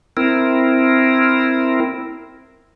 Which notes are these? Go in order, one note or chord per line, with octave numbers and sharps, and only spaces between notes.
C4 E4 A#4